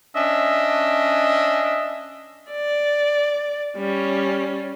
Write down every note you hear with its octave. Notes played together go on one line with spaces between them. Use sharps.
C#4 D4 D#5 E5
D5
G3 C#4